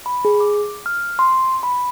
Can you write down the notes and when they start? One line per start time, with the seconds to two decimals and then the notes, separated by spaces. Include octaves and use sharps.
0.06 B5
0.25 G#4
0.40 D6
0.86 F6
1.19 C6
1.63 B5